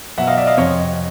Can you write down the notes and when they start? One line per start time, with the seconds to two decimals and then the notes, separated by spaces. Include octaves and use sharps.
0.18 B2 F#3 E5 F#5
0.27 D#5 F5
0.37 D5 E5
0.47 D#5 F5
0.57 F2 C3 F3 C#5 D#5